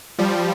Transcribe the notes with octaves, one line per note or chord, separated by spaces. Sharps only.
F3 G3